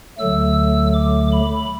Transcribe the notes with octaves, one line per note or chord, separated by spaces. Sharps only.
D2 D3 F#3 A3 E6
D6
B5